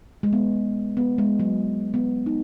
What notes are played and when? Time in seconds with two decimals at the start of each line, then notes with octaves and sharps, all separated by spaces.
0.23 G#3
0.33 B3
0.97 B3
1.18 G#3
1.40 F#3
1.94 B3
2.26 D#4